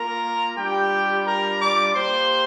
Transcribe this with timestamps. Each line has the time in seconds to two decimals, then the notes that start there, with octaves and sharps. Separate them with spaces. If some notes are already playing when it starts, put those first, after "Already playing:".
Already playing: A#3 F4 A#4 A#5
0.56 G3 D4 F4 G4 G5
1.26 A#4 A#5
1.60 D5 D6
1.95 A#3 G4 C5 C6